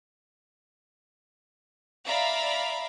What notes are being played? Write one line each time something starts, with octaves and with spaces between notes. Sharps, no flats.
D5 E5 F5 A#5 B5